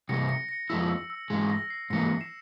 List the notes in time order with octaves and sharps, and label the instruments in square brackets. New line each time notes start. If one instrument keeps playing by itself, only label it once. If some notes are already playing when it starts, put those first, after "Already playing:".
[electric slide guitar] C3 E3 G3 [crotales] A#6 C#7
[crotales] A#6 C#7
A#6 C#7
[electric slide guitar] F2 C#3 F3 G#3 E4 [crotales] E6
[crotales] E6
E6
[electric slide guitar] G#2 E3 G#3
[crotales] A#6
C7
[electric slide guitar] G#2 E3 A#3 [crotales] A#6 C#7
[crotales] C7 E7